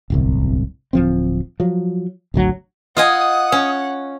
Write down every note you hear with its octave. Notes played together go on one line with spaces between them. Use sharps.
D1 G1 C2
D1 F3 C4
F3 F#3
G#1 D2 F#3
F4 D#5 F#5 G#5 D#6
C#4